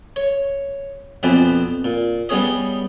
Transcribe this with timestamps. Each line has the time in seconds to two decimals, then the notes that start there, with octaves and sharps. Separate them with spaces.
0.16 C#5
1.23 F2 B2 C4 B4 D5 G#5
1.84 A#2
2.29 G3 B3 C#4 G#4 C#5 D#5